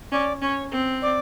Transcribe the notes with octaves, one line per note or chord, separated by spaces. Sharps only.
C#4 D5
C#4 C#5
C4
D5